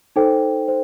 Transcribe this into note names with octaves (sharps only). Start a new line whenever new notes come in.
D#4 A4 C5 G5
C5